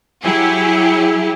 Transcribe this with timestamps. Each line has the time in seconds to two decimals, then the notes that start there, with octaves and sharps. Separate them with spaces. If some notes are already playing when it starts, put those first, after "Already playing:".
0.24 F#3 E4 G4 G#4